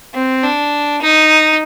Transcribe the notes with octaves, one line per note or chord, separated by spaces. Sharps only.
C4
D4
D#4